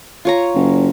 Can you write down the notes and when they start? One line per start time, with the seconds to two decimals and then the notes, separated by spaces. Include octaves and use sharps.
0.25 F4 C#5 A#5
0.55 F#1